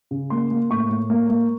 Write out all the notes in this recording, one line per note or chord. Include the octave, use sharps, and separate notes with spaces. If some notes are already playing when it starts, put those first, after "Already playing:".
C#3
A#3 C6
A#3
A2 C#6
A2
A#3
A#3